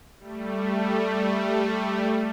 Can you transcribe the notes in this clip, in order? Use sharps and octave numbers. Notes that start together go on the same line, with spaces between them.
G3 A3